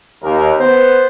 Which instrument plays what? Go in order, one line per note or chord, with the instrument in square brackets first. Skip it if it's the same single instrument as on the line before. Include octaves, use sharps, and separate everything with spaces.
[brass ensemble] D#2 A#4
[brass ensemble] B3 [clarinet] C5